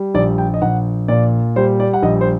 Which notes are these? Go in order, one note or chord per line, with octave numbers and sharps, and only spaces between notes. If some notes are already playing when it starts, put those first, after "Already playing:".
Already playing: G3
A#1 D5
G5
D#5
A#1 F#5
A#2 D5
G3 C5
D5
F#5
A#1 D#5
C5